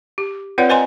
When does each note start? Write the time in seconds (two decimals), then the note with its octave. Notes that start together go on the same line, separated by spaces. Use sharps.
0.18 G4
0.58 C4 F4 B4 C#5 D5 F#5
0.69 B4 C5 D#5 G#5 A#5 C6